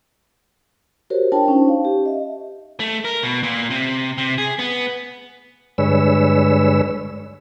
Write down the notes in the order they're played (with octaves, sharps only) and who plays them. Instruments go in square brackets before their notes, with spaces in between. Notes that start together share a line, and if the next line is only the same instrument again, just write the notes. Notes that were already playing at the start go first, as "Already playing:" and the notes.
[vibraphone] F#4 G4 A#4 C5 C#5
D4 F4 A#4 C#5 G5 A5
C#4 D#4 C5
F5
G4
D#5 E5
[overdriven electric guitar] A3
A#4
B2
A#2
C3
C3
G#4
B3
[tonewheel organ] G2 D3 G#3 B4 C#5 E6